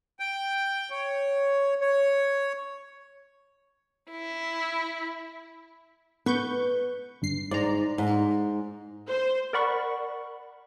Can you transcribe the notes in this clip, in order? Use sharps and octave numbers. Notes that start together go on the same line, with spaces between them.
G5
C#5
C#5
E4
B3 B4 C#6 G6
G1 G2 C7
G#2 D5 A#5
G#2
C5
A#4 D5 F#5 B5 C#6